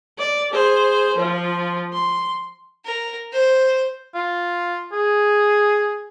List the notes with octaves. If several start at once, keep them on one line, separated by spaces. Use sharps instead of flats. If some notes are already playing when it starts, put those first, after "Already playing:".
D5
G#4 C5
F3 F4
C6
A#4
C5
F4
G#4